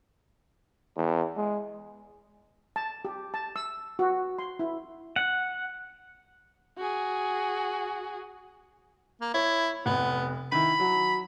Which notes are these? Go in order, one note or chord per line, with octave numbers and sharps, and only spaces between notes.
E2
G#3
A5
G4
A5
E6
F#4
C6
E4
F#5
F#4 G#4
A#3
E4 C#5
F1 B3
D#3 E4 B5
F#3